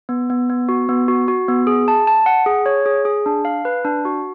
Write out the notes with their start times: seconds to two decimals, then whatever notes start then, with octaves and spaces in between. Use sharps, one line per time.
0.09 B3
0.30 B3
0.50 B3
0.69 F#4
0.89 B3
1.08 F#4
1.28 F#4
1.48 B3
1.67 G#4
1.88 A5
2.07 A5
2.26 F#5
2.46 G#4
2.66 C#5
2.86 G#4
3.05 G#4
3.26 D4
3.45 F5
3.65 B4
3.85 D4
4.05 F#4